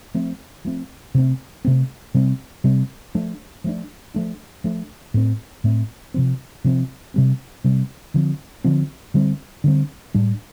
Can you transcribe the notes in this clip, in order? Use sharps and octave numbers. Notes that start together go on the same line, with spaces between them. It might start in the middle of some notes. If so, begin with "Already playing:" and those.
F3 A3 C4
F3 A3 C4
C3 A3 C4
C3 A3 C4
C3 G3 C4
C3 G3 C4
F3 A3 D4
F3 A3 D4
F3 A3 D4
F3 A3 D4
A2 A3 C4
A2 A3 C4
C3 F3 C4
C3 F3 C4
C3 G3 C4
C3 G3 C4
D3 F3 C4
D3 F3 C4
D3 G3 C4
D3 G3 C4
A2 G3 D4